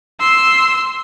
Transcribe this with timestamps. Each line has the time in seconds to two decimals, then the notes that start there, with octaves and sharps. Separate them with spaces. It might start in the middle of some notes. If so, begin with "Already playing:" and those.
0.20 C6 E6